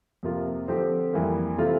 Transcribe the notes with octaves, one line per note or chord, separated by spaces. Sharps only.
F2 C3 F3 A#3 F4
D3 F3 C4 G4 C5
F2 E3 G3 A#3
C3 E3 A3 C4 F4